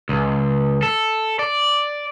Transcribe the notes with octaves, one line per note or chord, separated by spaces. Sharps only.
C#2
A4
D5